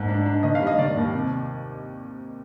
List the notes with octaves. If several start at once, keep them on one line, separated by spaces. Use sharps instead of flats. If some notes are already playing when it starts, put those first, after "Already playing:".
Already playing: G#2 A#3
D4
D4
D#3 D#5
F5
G3
D#5
D#3 D5
D#2
C3